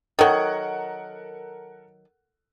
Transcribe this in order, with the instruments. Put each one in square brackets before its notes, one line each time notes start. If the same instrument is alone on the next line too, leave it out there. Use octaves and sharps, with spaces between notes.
[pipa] D#3 F#3 [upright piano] A4 A#4 F#5